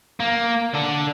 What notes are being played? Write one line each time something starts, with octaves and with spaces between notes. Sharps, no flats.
A#3
D3